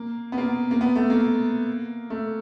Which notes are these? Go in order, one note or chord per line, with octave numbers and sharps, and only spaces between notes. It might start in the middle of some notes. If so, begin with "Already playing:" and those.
Already playing: A#3
B3
A#3
A#3
B3
A3
A#3
A3